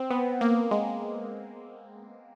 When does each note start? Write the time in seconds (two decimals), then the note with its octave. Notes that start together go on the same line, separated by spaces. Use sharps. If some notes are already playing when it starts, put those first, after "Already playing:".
Already playing: C4
0.11 B3
0.41 A#3
0.71 G#3